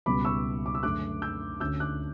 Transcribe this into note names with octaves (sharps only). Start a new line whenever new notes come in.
C#2 B2 G3 B5 D6
C#6 E6
D6
E6
F#2 D3 A3 C#4 D6 F#6
E6 G6
D2 D3 A3 C#4 E6 G6
D6 F#6